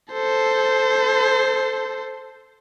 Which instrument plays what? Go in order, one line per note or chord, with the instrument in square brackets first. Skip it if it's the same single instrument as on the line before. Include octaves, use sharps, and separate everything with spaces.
[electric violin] A4 C5